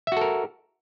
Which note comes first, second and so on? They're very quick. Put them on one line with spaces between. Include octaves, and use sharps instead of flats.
E5 F#4 A4 A#4